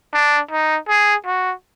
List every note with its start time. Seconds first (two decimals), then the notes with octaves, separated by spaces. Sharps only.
0.14 D4
0.51 D#4
0.89 G#4
1.26 F#4